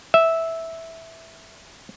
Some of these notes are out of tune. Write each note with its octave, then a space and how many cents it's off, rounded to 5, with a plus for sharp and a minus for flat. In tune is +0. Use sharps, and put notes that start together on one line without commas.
E5 -10